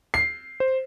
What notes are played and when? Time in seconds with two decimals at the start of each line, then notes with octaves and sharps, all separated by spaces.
0.14 C7
0.60 C5